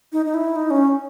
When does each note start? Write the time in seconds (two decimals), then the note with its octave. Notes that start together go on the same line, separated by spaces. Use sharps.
0.13 D#4
0.26 D#4
0.34 E4
0.56 D#4
0.70 C#4